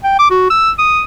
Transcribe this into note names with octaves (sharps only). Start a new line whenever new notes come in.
G5
D6
F#4
E6
D#6